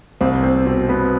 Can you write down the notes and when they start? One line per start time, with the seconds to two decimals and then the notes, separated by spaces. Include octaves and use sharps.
0.21 C2 C4
0.43 C4
0.66 B2 C4
0.89 B3